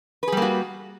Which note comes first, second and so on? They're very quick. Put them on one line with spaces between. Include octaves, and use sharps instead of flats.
B4 G#4 G3 A#3 F#4